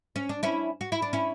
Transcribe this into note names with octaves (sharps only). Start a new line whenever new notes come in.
C#4
D4
C#4 E4
F#4
E4
D4
C#4 E4